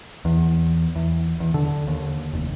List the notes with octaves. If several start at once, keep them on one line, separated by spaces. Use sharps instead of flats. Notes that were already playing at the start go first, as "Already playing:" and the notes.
E2
E2
E2
D3
D#2
F1